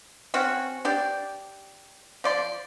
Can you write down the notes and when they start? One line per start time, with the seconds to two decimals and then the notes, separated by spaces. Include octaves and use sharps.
0.34 C4 C#4 F#4
0.85 D4 G4 D5
2.24 F3 D5 C6